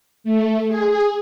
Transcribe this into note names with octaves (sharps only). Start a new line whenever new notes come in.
A3
G#4